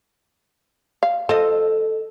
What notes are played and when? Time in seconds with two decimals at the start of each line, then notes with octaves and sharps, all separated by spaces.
1.03 F5
1.29 F3 A4 D#5